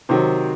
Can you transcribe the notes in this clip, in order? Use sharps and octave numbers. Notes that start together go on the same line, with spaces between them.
C3 D#3 F#3 C5